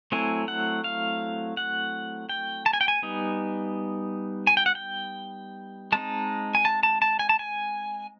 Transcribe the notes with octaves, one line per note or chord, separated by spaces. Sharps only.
F#3 A3 C4 E4 G#5
F#5
F5
F#5
G5
A5
G#5
G5
G#5
G3 B3 D#4
G#5
G5
F#5
G5
G#3 C4 D#4 A5
G#5
A5
A5
A5
G#5
A5
G#5